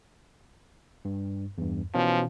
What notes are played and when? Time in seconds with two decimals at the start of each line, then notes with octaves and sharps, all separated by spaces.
1.05 G2
1.58 E2 G2
1.94 B2 E3 F3 C#4